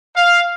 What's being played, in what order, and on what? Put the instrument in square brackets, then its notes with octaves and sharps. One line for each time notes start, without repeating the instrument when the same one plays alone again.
[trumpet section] F5